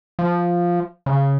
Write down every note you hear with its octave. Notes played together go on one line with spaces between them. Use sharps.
F3
C#3